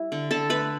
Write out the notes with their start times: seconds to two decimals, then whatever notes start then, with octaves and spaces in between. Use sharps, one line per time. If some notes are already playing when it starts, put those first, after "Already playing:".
Already playing: G3 E4 E5
0.12 D3
0.31 D3 A4 A5
0.50 A3 B4 B5